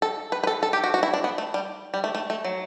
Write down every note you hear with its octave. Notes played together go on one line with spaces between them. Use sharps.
A4
B4
B4
A4
A4
G4
F#4
F#4
E4
D4
B3
A3
G3
G3
A3
A3
A3
F#3